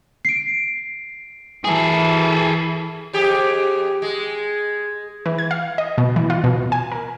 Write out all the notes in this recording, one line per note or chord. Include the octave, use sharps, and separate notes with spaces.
C7 D7
E3 G#4 A4
F2 G4 G#4
G#3
E3
G#6
F5
D#5
B2
E3
F4
B2
G#5
A#4